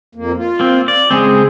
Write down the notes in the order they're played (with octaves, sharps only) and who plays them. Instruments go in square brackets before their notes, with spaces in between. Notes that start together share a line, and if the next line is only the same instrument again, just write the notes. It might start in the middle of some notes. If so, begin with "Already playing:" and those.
[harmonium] F2 A#3
F4
[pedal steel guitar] A#3 C4
D5
[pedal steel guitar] C#3 G#3 C4 [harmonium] G#4